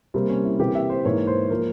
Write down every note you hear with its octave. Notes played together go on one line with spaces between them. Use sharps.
C3 G3 A#3 C4
C#4
E4
C3 E3 A#3 G4
E5
C5
G#2 E3 A#3 C#5
C5
F3 A#3 A#4